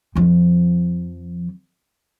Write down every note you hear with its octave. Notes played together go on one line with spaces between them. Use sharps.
F2 F3